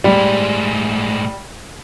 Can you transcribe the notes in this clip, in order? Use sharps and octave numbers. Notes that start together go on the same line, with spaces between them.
A2 G3 G#3